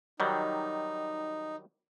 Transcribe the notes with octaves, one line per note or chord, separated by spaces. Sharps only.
D#3 F#3 G3 D#4